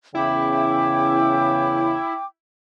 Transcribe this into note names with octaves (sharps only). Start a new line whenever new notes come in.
E2 C#3 E4 G5 D6